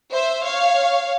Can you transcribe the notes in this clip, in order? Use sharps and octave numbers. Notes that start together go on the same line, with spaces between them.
C5 E5
C#5 F5